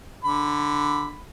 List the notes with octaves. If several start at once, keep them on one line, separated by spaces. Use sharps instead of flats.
D3 B5